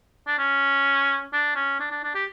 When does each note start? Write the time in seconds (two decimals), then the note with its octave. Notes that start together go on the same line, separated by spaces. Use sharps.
0.27 D4
0.38 C#4
1.33 D4
1.55 C#4
1.80 D4
1.91 D4
2.03 D4
2.14 G4